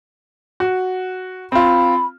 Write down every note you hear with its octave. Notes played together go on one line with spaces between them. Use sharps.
F#4
C4 F4 B5